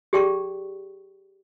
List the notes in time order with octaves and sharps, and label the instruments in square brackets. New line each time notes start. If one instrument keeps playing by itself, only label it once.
[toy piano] G4 G#4 D5 G5 A5 C#6